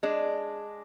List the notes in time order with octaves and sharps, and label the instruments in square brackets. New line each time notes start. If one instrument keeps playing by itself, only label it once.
[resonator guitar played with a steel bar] G#3 D4